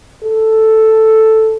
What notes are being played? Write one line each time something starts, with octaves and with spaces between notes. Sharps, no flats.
A4